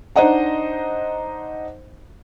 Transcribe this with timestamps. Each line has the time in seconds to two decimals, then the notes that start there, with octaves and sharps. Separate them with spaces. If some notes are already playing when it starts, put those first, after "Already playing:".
0.16 D4 D#4 C5 D#5 F#5 A#5